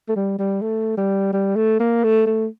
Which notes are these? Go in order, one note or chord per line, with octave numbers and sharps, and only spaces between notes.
A3
G3
G3
A3
G3
G3
A3
A#3
A3
A3